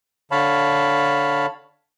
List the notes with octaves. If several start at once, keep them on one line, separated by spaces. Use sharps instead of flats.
D3 C#5 F5 A5 B5